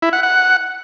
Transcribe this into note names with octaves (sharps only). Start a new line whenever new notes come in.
E4
F#5
F#5